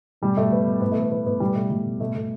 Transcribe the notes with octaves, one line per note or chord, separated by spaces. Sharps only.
B2 G3
B2 A3
B2 B3
B2
A2 B3
A3
E3 B3
E3 B3
A2 B3
B2 G3
B2 A3
B2 G3
B2
B2 A3
B2 A3